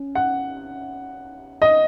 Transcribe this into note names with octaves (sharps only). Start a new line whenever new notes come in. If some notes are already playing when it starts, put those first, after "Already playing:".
Already playing: C#4
F#5
D#5